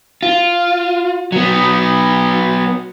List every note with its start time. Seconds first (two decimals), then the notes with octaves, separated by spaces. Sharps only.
0.23 F4
1.32 F#3 B3